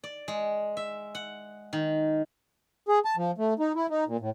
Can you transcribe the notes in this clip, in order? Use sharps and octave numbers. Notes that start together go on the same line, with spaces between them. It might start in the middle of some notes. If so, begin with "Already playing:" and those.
D5
G#3
E5
F#5
D#3
G#4
A5
F3
A3
D#4
E4
D#4
A#2
A2